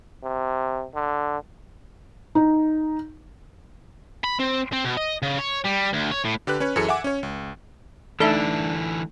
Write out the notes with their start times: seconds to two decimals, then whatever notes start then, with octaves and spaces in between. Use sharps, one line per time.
0.23 C3
0.95 D3
2.35 D#4
4.24 B5
4.40 C4
4.73 C4
4.85 B2
4.97 D#5
5.22 C#3
5.38 C#5
5.64 G3
5.93 D2
6.11 C#5
6.25 A2
6.47 D3 G4 B4 F#6
6.60 C#4 B4 C#5
6.76 F#2 E3 G#4 A4 C#7
6.88 E5 F#5 G#5 D6
7.04 C#4 C#5
7.23 C#2
8.20 D3 E3 A3 D4 D#4 A4 E5